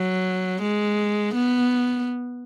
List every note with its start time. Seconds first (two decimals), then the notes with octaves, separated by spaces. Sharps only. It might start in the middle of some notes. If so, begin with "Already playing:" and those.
Already playing: F#3
0.63 G#3
1.35 B3